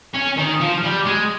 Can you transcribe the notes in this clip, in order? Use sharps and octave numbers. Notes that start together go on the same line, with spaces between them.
C#4
D#3
F3
G3
G#3